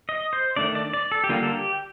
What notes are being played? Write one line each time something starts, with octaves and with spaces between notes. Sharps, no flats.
D#5
C5
D#3 A3 D4 D5
D5
D5
A4
G4
D3 G3 A#3 F4
A4
G4